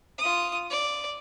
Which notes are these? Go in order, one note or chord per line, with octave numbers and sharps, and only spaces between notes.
F4 D#6
D5